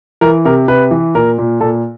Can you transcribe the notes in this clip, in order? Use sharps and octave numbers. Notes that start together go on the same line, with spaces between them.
E3 A#4
C3 A#4
C3 B4
E3
A#2 A#4
A#2
A#2 A4